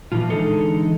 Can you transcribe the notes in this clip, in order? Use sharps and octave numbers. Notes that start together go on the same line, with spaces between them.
A#2 E3 F3 F4
D3 E3 G#3 D#4 G#4 A4